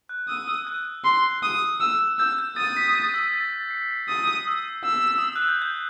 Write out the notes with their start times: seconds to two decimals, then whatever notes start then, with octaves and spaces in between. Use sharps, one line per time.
0.09 F#6
0.29 D#6 E6
0.48 E6
0.67 F#6
1.05 C6
1.43 D#6
1.80 E6
2.19 E6 G6
2.39 G6
2.56 D#6 A6
2.77 B6
2.95 A6
3.14 E6
3.32 A6
3.52 A6
3.70 C7
3.91 B6
4.08 D#6 A6
4.21 G6
4.34 E6
4.47 E6
4.85 E6
5.18 D#6
5.24 E6
5.36 F#6
5.48 G6
5.62 G6